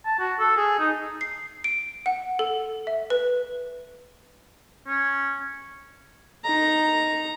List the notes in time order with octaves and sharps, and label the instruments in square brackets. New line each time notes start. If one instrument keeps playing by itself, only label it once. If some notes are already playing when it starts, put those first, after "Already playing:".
[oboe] A5
F#4
A4
G#4
D#4
[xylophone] C7
D7
F#5
A4
E5
B4
[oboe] C#4
[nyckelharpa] D#4 A#5